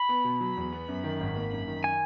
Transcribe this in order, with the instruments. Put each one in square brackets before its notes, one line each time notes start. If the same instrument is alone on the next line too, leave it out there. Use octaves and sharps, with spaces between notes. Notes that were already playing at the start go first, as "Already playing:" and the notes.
Already playing: [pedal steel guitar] B5
[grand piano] B3
B2
F#3
E2
B3
F#2
D#3
G#1
A#3
F#2
D#3
[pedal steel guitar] G#5